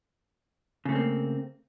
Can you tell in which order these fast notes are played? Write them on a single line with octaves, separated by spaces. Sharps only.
C#3 A3 C4 A#3